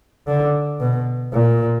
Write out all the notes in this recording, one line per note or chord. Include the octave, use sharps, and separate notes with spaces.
D3
B2
A#2